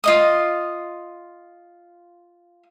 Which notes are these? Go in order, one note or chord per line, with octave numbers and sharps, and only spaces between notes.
F4 D#5 D#6